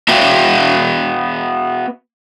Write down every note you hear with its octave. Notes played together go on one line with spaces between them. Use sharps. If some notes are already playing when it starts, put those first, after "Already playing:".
B3 F#4 E5 F5 G5